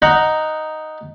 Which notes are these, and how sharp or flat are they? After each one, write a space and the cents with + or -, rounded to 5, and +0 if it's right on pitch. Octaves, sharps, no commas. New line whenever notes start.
D#4 +0 F#5 +0 A#5 +0